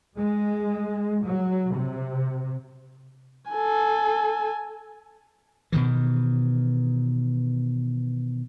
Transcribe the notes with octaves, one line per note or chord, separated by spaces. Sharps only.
G#3
F#3
C3
A4 G#5
B2 D#3 E3